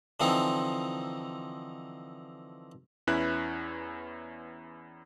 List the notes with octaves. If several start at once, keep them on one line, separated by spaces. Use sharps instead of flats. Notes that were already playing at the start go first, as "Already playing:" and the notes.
D3 E3 F3 C4 D#4
E2 C#4 E4 B4 F#6